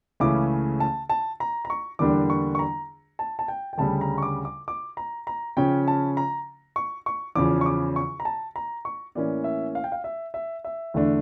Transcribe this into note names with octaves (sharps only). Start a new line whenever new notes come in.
C#2 C#3 E3 A3 C#4 D6
A5
A5
A#5
A#5
C#6
E2 D3 G3 A#3 D4 D6
C#6
C#6
A#5
A5
A5
G5
G5
D2 C#3 G3 A5
A#5
C#6
D6
D6
D6
A#5
A#5
C#3 F3 C#4 G5
A5
A#5
C#6
C#6
E2 C#3 F3 C#4 D6
C#6
D6
C#6
A#5
A5
A#5
C#6
A2 E3 A#3 C#4 D5
E5
F5
G5
F5
E5
E5
E5
E2 D3 A3 D4